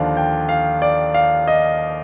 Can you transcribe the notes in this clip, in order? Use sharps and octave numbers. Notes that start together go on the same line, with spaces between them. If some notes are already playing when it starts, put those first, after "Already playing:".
Already playing: D#2 D3 F3 D5 F5
G5
F5
D5
F5
D#5